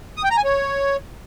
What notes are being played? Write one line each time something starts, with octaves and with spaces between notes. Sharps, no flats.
D#6
G5
A#5
G#5
C#5